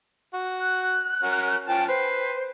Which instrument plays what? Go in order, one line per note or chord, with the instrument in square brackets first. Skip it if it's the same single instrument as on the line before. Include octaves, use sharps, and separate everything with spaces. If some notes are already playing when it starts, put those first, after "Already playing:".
[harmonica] F#4
[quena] F#6
[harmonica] C#4 F#4 A#4
[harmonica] F3 C#4 A5 [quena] G5
[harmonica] B4 [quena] C5